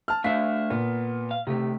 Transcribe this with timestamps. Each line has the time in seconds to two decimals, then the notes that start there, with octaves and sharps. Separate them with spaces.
0.08 A5 F6
0.24 A3 D4 E5 F5 B6
0.70 A#2 B3
1.31 F5
1.47 C3 D#3 A3 G4